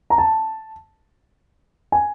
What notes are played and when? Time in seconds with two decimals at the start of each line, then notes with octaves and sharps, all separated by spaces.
0.10 A#5
0.18 A5
1.92 G#5